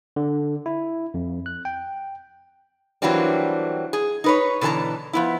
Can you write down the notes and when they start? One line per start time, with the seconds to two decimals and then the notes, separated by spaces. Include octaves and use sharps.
0.16 D3
0.66 E4
1.14 F2
1.46 F#6
1.65 G5
3.02 E3 F#3 G3 A#3 C4 D4
3.93 G#4
4.24 D#4 B4 C#5
4.61 B2 D3 E3 A4 A5 A#5
5.13 F3 B3 E4